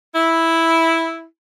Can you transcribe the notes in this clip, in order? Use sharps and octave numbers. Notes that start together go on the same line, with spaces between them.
E4